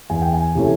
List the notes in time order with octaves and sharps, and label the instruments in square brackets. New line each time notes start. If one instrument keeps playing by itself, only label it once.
[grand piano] E2 G#5
G5
G#5
C3 E3 A3 C#4